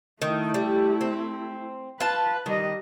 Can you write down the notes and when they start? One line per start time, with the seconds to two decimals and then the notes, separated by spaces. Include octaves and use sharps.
0.22 D#3 A3 E4
0.54 G3
1.01 C4
2.00 F4 B4 A5
2.46 D#3 G3 D#5